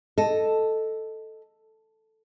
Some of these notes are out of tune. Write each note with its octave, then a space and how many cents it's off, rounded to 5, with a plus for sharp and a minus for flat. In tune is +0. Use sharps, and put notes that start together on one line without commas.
A4 +0 D#5 +0